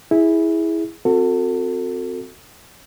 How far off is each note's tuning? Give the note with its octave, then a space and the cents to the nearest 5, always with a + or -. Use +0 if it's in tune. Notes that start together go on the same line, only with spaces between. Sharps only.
E4 -10 G#4 +0
C4 -5 F#4 -20 A4 +30